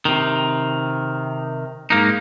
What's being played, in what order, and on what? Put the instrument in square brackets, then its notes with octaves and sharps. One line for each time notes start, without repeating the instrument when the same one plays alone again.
[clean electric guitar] C3 D#3
G#2 A#3 D#4